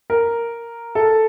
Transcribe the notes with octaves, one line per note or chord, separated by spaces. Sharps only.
A#4
A4